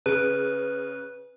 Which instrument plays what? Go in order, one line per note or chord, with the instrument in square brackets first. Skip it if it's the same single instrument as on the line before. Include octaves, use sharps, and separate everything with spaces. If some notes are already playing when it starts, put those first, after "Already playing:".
[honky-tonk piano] C#3 D7 [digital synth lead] B4